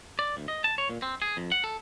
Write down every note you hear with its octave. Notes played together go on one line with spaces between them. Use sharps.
D5
D2
D#5
A5
C#5
A#2
C4
G#4
F2
F#5
A4